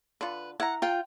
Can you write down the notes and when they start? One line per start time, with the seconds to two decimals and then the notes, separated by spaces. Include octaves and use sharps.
0.21 D3 F4 B4
0.60 E4 F#5 A#5
0.82 F4 G5